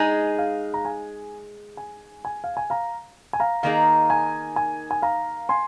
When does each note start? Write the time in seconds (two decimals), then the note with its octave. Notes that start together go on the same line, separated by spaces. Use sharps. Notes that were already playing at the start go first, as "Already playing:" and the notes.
Already playing: G#3 D#4 G#4 G#5
0.38 F5
0.74 A#5
0.85 G#5
1.77 G#5
2.25 G#5
2.44 F5
2.57 G#5
2.70 F5 A#5
3.33 G#5
3.40 F5 A#5
3.63 D#3 A#3 D#4 G#4 F5
4.10 G#5
4.56 G#5
4.91 G#5
5.02 F5 A#5
5.49 G#5 C6